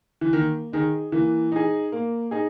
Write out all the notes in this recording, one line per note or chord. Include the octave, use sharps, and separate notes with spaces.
E3
D#3 A#3
D#3 D#4 G#4
E3 A#3
D#4 G#4
A#3
D#4 G#4